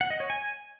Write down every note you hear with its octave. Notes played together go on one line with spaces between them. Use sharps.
F#5
D#5
C#5
G#5